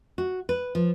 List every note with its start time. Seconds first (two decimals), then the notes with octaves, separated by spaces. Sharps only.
0.18 F#4
0.49 B4
0.75 F3